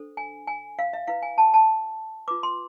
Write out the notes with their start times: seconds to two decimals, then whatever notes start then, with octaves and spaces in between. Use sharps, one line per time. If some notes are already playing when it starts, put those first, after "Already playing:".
Already playing: D4 A4 C5
0.17 G#5
0.47 G#5
0.79 F5
0.93 E5
1.07 E4 B4 F5
1.22 G#5
1.38 A5
1.54 A5
2.28 F4 B4 D6
2.43 C6